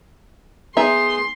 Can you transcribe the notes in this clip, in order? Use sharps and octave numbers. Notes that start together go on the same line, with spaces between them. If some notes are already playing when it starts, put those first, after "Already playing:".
B3 D#4 G#4 E5 C6